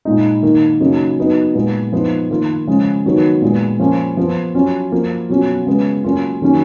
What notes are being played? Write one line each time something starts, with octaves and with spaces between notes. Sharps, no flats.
A#2 G#3 D#4
D#3 A#3 D#4
C#3 F#3 A#3 D#4
F#3 B3 D#4
A#2 G#3 B3
F3 B3 D#4
D#3 A#3 F4
C#3 F3 G#3
D#3 F#3 B3 D#4
A#2 G#3 B3
F3 A#3 C#4 F4
F3 B3 F4
F#3 C#4 F4
F3 A#3 F4
B2 F#3 C#4 F4
C#3 G#3 B3
F#3 A#3 C#4 F4
D#3 F#3 A#3 C#4